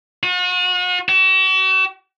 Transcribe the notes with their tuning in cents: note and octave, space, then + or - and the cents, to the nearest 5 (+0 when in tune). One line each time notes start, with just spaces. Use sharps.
F#4 -45
F#4 +45